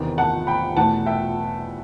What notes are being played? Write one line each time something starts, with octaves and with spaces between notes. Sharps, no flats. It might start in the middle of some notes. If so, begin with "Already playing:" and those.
Already playing: E2 C3 D#3
F#5 A5
G5 B5
E2 B2 A3 F#5 A5
E5 G5